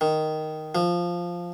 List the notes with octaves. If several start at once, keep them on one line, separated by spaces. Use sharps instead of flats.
D#3
F3